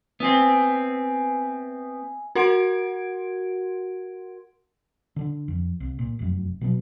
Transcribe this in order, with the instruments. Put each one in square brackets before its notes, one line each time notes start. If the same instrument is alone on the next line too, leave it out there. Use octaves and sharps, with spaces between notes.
[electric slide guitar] B3 C4 [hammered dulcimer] E5 G#5
[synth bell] F#4 A#4 F#5 C6 G#6 D7
[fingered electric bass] D3 D4
F2
C2
A#2
F1 F#2
B2 F#3 B3